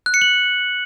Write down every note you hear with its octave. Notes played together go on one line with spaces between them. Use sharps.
F#6
C#7
F#7